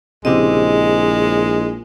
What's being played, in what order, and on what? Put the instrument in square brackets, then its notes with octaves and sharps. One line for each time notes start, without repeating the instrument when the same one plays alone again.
[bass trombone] A#1 [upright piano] C#3 C4 G4 [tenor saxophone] G#3 [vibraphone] E4 D#5